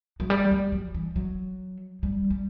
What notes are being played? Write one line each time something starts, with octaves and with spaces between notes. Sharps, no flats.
F#3
G3
G3
F#3
E3
F#3
G3
G3